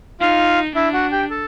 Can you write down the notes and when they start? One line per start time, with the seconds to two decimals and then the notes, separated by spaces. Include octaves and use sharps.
0.20 D#4 F4 F5
0.75 D4 E4 E5
0.94 F#4 F#5
1.12 G4 G5
1.30 A4 A5